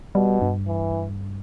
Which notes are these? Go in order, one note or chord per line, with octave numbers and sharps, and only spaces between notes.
B2 G3
G2
E3